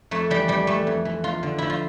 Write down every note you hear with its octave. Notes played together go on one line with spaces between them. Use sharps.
F2 A3
E3 G3
F2 G3
E3 A3
F2
E3
E2 F4
D3
F3 E4
F4